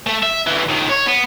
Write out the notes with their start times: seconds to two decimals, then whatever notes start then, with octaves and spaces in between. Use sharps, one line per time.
0.07 A3
0.23 E5
0.47 D2 E3
0.69 C#2 D#3
0.89 C#5
1.07 B3